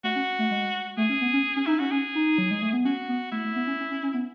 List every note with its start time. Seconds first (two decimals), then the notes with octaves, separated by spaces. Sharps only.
0.04 A3 F#4
0.16 C#4
0.39 A3
0.51 G#3
0.97 A3 G#4
1.09 C#4
1.21 B3
1.33 C#4
1.56 C#4
1.66 D#4 E4
1.79 C#4 F#4
1.91 C#4 G#4
2.15 D#4
2.38 F#3
2.51 G#3
2.62 A3
2.73 B3
2.85 C#4 F#4
3.08 B3
3.32 A3 E4
3.44 A3
3.56 B3
3.67 C#4
3.80 C#4
3.91 C#4
4.03 C#4
4.14 B3